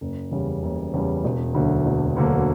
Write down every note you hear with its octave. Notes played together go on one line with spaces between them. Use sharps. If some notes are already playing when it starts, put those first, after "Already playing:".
F#1
E2 C#3 G3
F#1
E2 C#3 G3
E1
D2 D3 F#3 A#3
E1
D2 D3 F#3 A#3